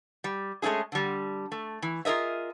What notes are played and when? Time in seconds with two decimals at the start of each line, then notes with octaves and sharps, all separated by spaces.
0.24 G3
0.62 G#3 A3 C#4 E4 G#4
0.92 D3 G3
1.52 A3
1.82 E3
2.05 F4 G#4 A#4 D#5 E5